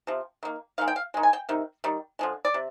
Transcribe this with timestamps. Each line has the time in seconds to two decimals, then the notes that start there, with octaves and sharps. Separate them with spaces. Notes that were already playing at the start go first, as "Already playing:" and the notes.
0.07 C3 F3
0.43 D#3 A#3
0.78 D#3 G#3 F5
0.88 G5
0.96 F5
1.14 D#3 G#3
1.23 G#5
1.33 G5
1.49 C3 D#3
1.84 D#3 G3
2.19 D3 F3 G#3
2.45 D5
2.54 C3